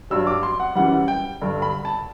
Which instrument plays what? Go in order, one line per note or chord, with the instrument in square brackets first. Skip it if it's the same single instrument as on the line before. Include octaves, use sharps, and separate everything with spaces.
[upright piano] G2 F#3 E6
D6
C6
F#5
F#2 E3 G3 F#5
G5
G2 D3 G3
B5
A5